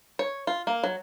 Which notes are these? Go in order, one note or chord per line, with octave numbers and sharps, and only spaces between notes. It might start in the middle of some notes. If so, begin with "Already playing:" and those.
C#5
F4
A#3
F#3